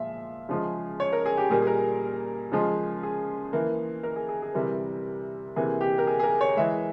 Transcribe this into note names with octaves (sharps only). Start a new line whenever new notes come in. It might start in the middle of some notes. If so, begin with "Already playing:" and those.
Already playing: A#2 F3 G#3 E5 F5
C#3 F3 G#3
C#5
A#4
G#4
G4
A#2 G3 A#3 G#4
G#4
A#4
C#3 F3 G#3
G#4
E3 A#3
A#4
G#4
G#4
G#4
C3 E3 G3 A#4
C3 E3 A#3 G#4
G4
A#4
G#4
G#4
A#4
C#5
E3 G#3 E5